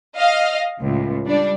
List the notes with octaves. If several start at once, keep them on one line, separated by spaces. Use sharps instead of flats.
D#5 F5 F6
C#2 A2
G3 D4 D5